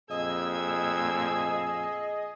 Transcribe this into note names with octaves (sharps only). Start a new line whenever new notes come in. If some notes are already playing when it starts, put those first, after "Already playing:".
F2 A#2 G#4 D#5 E6 G#6